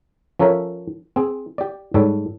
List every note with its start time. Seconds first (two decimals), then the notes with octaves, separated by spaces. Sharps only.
0.39 F3 C#4 A4 A#4 C#5 E5
1.16 C4 G#4
1.58 G4 D5
1.94 G#2 G3 A4 C#5